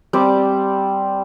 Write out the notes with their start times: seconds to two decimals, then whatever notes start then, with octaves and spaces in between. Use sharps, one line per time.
0.13 G3 C4 G4 D5